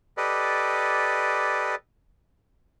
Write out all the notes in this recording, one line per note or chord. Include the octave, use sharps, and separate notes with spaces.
G4 A4 B4 D5 D#5